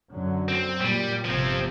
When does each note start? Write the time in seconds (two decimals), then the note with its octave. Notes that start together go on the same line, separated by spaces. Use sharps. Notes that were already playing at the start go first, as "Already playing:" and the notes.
0.10 F#2 D3 F#3
0.48 C4
0.81 A#2 G3
1.25 G1 C3 F3 C4